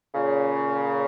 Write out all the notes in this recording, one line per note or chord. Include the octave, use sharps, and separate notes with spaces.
A#2 C#3